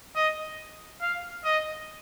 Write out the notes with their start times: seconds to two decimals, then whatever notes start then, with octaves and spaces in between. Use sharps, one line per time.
0.15 D#5
1.01 F5
1.44 D#5